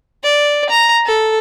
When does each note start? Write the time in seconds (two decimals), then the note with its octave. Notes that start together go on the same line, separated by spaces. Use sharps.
0.23 D5
0.69 A#5
1.06 A4